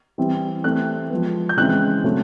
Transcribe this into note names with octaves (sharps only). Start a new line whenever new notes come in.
E3 G3 C4
E3 A3 C4 F#6
F3 G#3 B3
G6
C#3 E3 G#3 C4 F#6
C#3 F#3 A3 C4